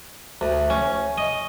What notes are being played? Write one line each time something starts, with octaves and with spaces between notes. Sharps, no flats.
D2
C#4
D#5